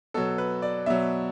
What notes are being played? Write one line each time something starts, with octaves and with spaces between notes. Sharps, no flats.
B2 F#3 A4
B4
D5
B2 F#3 E5